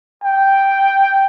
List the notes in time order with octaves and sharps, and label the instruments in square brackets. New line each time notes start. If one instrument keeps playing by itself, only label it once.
[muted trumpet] G5